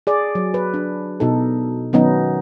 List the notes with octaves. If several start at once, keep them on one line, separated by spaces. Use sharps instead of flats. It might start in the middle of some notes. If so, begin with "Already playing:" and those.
G#4 D5
F#3
B4
D4
B2 D#4 A4
D#3 F#3 B3 C#4 D#4